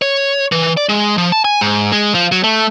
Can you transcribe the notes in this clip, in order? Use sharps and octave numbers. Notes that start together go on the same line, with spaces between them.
C#5
E3
D5
G#3
F3
A5
G#5
G#2
G#3
F3
F#3
A3